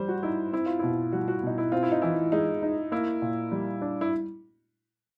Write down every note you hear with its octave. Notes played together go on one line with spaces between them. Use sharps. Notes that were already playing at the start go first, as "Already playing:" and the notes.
Already playing: G3 C5
F#4
D#4 E4
C4 E4
F4
B2 E4
G3 F#4
F#4
B2 D#4
E4
C4 F4
E4
D#4
E3 E4
G#3 D#4
D#4
A#3 E4
A#2
G3
D4
E4